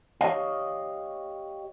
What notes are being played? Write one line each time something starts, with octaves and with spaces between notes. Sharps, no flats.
G4 C#5 D#5 F5